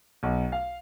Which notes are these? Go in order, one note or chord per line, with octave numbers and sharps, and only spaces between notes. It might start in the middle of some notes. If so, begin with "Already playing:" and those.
B1
F5